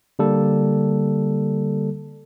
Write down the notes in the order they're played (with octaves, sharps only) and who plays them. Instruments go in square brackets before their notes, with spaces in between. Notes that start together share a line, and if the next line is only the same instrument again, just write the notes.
[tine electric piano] D3 G3 A#3 A4